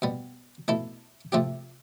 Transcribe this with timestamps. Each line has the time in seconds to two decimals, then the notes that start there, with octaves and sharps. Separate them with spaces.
0.02 B2 G3 B3
0.68 B2 A3 E4 A4
1.32 C3 F3 A3 C4 G4